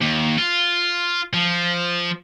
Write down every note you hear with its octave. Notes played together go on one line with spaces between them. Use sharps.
D#2
F4
F3